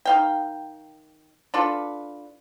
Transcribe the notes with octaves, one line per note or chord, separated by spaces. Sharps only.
D#3 F5 G5
D4 F4 A4 B4